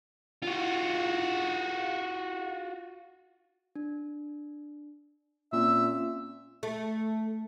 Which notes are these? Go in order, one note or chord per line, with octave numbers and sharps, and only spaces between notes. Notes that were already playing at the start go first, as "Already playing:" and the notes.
F4 F#4
D4
A#2 C4 C#4 E5
A3